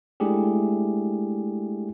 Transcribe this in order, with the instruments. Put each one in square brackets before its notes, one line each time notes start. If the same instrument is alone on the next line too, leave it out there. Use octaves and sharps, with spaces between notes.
[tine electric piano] G#3 A3 D4 E4 G4 G#4